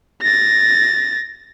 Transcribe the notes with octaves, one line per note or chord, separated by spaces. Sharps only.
A6 A#6